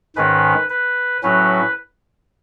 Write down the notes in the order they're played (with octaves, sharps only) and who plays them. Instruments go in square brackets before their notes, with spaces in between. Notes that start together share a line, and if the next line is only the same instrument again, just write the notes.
[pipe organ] G#2 D#3 G#3 C#4 B4
B4
A2 F#3 C#4 B4